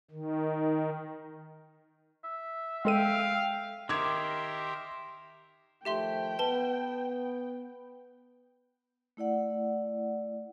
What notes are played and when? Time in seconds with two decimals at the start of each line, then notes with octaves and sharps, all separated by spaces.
0.11 D#3
2.24 E5
2.85 G#3 A4 F5 G5 D#7
3.89 D#3 G4 A#4 E5 C6 D6 G#6
5.85 D#3 F3 A3 G4 E5 G5 C6
6.39 B3 B4 A5 G7
9.17 A3 E4 D5 F#5